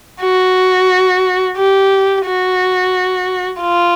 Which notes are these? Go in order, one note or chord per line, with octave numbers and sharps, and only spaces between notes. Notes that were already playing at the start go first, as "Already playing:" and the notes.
F#4
G4
F#4
F4